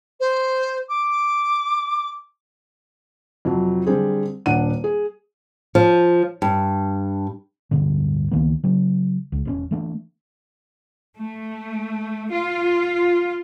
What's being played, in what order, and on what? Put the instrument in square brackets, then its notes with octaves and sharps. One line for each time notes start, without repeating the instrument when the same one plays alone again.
[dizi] C5
D6
[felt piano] F2 C3 F#3
D3 G3 C4 G#4
D#1 D4 F#5 D#7
G#4
[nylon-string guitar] F3
G2
[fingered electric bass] D1 G2 B2 D3
C#2 D#3 A#3 B3
C#3 F#3
C#2
E1 A2 C#4
E3 A3 D4
[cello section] A3
F4